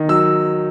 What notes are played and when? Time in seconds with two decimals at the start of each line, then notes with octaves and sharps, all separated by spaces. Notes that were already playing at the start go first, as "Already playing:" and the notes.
Already playing: D#3
0.09 F#3 E6